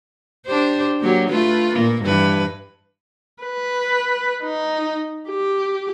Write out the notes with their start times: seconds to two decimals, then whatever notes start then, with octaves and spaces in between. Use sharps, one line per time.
0.47 D4 G4 C5
1.00 F#3 A#3 G4
1.29 A3 F4 B4
1.75 A#2 A#3
2.03 G2 E3 B4
3.43 B4
4.43 D#4
5.29 G4